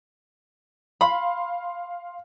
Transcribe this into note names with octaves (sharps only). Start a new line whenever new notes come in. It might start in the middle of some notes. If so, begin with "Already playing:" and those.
F5 B5 C6